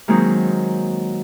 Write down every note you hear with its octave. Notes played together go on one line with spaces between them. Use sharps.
D#3 F#3 G#3 A#3 C4 D#4